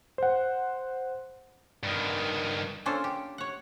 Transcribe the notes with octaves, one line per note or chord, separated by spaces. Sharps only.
C5 F#5
G2 D#3
A#3 C#4 D4 F4 A4 C5
G4
C#5 F#5